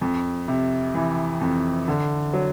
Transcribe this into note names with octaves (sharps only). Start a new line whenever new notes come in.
F2
C3
E3
F2
D3
F#3